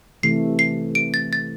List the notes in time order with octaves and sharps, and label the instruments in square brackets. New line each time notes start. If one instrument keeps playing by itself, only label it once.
[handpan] C3 E3 A3 [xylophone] C7
[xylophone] C7
D7
A6
A6